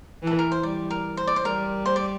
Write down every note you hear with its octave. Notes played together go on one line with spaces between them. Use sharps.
E3 A4
A#4
C5
G3 D5
A#4
C5
D5
C5
G3 A#4
C5
D5